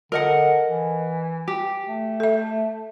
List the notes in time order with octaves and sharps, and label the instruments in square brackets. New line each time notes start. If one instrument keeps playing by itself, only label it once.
[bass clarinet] D3 [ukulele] A#4 D#5 F#5
[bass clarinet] E3
[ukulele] G4
[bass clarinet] A3
[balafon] A4 E5